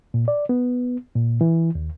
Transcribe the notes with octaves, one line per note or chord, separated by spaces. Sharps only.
A#2
D5
B3
A#2
E3
D#2